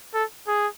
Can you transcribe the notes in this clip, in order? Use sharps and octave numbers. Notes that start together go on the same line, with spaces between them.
A4
G#4